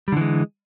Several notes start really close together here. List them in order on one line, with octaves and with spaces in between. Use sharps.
G3 D3 E3 G#3